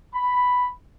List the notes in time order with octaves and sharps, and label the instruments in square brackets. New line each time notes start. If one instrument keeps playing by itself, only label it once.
[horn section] B5